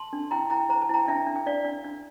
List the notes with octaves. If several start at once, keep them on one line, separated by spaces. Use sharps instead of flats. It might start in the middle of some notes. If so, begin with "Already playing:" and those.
Already playing: A5 C6
D4
E4 G5 A#5
E4 G5 A#5
C5 A#5
A5
E4 G5 A#5
D4 E5 G5
D4
G5
D4 D5 F5
D4
D4